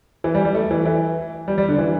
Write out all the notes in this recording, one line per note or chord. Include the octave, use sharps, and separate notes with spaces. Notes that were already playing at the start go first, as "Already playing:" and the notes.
E3
G3
G3
A3
E3
E3
G3
G3
D3
E3